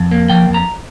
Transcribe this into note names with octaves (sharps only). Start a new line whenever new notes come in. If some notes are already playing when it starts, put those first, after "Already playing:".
Already playing: F2
A#3
F3 G5
F2
A#5